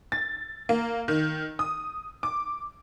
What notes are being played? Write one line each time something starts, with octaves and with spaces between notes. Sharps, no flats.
A6
A#3
D#3
D#6
D6